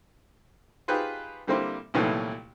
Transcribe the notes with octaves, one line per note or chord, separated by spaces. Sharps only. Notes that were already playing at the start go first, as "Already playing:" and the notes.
D#4 F4 G4 G#4 B4 C5
D3 G3 A#3 C4 E4 C5
C2 A#2 D#3 E3 F#3 A3